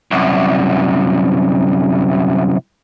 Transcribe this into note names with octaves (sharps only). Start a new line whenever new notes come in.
C2 F#2